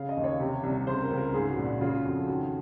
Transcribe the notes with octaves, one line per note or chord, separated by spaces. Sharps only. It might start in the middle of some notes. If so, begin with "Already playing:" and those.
Already playing: C#3 F5
D#5
D#2
C#5
C3
C2
C#3 C5
A#4
C#2
A#4
G#2 G#4
F#4
A#1
F#4
C#3 F4
F2 F#4
D#3 F#4